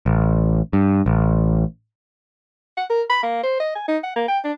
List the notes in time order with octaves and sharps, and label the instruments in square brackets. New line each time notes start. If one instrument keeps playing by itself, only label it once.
[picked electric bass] A1
G2
A1
[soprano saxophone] F#5
A#4
B5
A#3
C5
D#5
G#5
D#4
F#5
A#3
G5
D4